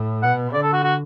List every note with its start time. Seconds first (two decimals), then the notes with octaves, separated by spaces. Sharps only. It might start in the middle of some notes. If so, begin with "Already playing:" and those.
Already playing: A2
0.22 B2 F#5
0.53 D3 D5
0.63 A4
0.73 F#4
0.83 F#4